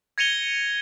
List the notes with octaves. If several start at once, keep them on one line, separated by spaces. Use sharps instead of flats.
G#6 A#6 C#7 D#7 F7 G7